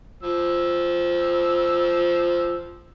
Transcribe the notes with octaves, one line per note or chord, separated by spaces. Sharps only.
F3 E6